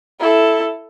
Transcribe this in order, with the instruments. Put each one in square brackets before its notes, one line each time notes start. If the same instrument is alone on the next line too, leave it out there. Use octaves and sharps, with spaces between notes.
[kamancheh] E4 A4